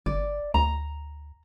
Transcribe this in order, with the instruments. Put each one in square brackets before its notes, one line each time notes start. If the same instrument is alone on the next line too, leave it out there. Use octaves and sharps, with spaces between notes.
[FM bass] G1 [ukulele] D5
[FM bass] D2 [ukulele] A#5